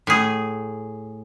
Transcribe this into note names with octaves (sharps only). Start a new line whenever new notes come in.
A2 G#4